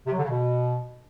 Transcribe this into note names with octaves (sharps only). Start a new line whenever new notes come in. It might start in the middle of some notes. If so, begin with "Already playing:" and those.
C3
F#3
D3
C#3
B2